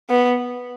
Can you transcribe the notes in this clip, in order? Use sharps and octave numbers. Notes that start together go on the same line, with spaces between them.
B3